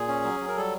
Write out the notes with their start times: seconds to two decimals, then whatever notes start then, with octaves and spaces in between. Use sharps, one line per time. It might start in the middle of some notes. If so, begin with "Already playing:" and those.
Already playing: A#2 G#4
0.08 C#4
0.24 F#3
0.40 F#3
0.48 A#4
0.57 G3 A4